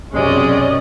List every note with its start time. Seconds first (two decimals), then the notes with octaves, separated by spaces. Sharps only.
0.13 B1 F#2 C3 G#3 C#4 D5 D#5